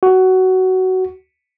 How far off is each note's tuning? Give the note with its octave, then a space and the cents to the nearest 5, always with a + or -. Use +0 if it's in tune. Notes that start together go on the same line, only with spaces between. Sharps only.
F#4 +15